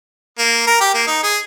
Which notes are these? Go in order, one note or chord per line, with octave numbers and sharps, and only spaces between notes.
A#3
A#4
G4
A#3
D#4
G#4